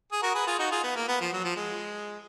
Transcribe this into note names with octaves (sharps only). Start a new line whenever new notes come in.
G#4
F#4 A#4
G#4 B4
F4 G#4
D#4 F#4
F4 G#4
B3
A#3
B3
F3
F#3
F3
G#3